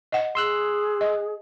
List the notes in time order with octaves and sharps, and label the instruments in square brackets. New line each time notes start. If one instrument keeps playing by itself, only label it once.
[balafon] D#5 F#5
[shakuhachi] G#4 [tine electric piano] C6 E6 F#6
[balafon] D#5